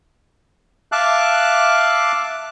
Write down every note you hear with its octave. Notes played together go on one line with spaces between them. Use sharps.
E5 F5 A5 D6 F#6